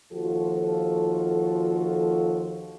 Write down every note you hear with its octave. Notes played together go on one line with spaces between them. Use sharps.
D#2 F3 F4 F#4 A4